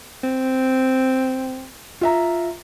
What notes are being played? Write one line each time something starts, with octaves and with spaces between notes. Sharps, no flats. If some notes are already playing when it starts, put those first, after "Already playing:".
C4
F4 E5 A#5